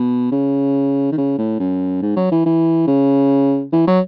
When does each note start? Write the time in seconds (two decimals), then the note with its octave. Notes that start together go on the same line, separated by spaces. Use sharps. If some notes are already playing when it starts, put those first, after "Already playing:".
Already playing: B2
0.32 C#3
1.12 D#3
1.18 C#3
1.38 A2
1.59 F#2
2.02 G#2
2.16 F#3
2.32 E3
2.46 E3
2.87 C#3
3.73 E3
3.87 F#3